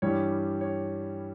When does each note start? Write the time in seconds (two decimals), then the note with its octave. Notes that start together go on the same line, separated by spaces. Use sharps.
0.02 G2 E3 G3 C#5
0.61 C#5